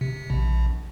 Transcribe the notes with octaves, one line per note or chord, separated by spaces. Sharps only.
C3
A#1